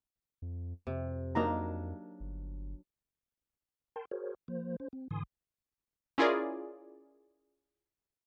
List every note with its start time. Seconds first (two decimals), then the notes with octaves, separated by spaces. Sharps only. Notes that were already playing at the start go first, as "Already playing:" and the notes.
0.42 F2
0.87 F2 C3
1.35 F#3 A#3 D4 D#4 F5 A#5
2.20 G1
3.96 A#4 G5 A5 C6
4.11 F#4 G#4 A#4 C5 C#5
4.48 F3 A#3 C5
4.80 C#4 C5
4.93 C4
5.11 G#2 D3 E3 G#5 C6 D#6
6.18 C#4 E4 F4 G#4 A#4 D5